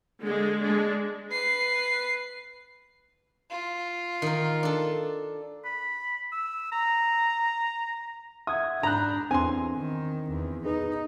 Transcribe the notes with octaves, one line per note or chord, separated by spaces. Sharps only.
D3 G#3
G#3 D4
B4 C7
F4
D#3 A#4
D4 A4
B5
E6
A#5
E5 F#5 D#6 G#6
G#2 D4 A#5 B5 F#6 G6
E2 C4 D4 G#5 C6
D#3
E2
D#4 G#4 B4